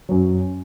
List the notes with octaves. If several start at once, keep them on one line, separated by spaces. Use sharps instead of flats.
F#2 F#3